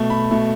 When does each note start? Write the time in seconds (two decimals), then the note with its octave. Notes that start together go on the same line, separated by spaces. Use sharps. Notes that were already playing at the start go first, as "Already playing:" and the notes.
Already playing: B2 A3
0.10 B5
0.31 B2 A3